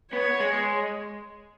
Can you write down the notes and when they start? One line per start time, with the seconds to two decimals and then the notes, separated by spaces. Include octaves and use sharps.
0.12 B3 C#5
0.40 G#3